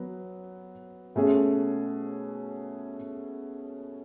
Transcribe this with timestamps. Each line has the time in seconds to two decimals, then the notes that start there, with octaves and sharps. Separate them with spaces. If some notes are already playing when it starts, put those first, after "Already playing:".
Already playing: F#3 B3
1.15 B2 A3 C#4 G#4